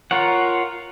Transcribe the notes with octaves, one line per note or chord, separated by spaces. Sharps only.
F4 A#4 C#5 F#5